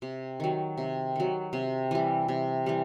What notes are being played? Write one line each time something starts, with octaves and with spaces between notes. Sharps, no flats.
C3
D#3 F#3
C3
D#3 F#3
C3
E3 G3
C3
E3 G3